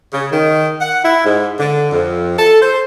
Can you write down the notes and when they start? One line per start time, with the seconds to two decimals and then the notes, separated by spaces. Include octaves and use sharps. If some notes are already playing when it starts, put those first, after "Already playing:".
0.12 C#3
0.31 D#3
0.81 F#5
1.03 E4
1.25 G#2
1.58 D3
1.90 F2
2.37 A4
2.61 C5